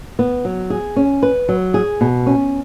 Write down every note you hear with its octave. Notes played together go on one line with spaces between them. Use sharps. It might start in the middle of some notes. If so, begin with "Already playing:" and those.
B3
F#3
G#4
C#4
B4
F#3
G#4
B2
C#4